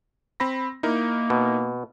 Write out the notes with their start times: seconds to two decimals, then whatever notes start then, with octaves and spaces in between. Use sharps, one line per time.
0.40 C4 B5 A#6
0.83 A#3 D#4 E4 A#4
1.30 B2